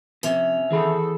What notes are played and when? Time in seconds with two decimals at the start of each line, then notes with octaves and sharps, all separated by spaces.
0.23 F2 C3 C#4
0.71 E3 G#4 A4 B5